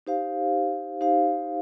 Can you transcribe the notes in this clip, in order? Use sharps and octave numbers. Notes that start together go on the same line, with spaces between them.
D#4 G4 C5 F5
D#4 G4 C5 F5